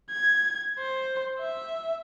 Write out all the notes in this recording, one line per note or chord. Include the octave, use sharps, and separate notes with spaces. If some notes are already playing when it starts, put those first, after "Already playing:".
G#6
C5
E5